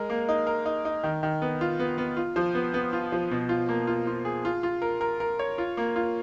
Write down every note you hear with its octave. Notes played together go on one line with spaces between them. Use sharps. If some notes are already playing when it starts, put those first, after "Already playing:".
Already playing: G#3 A#4
A#3
D#4
A#4
D#4
D#4
D#3
D#3
B3
F4
B3
B3
F4
F3
B3
B3
F4
F3
B2
F4
A#3
F4
F4
G#4
F4
F4
A#4
A#4
A#4
C#5
F4
A#3
F4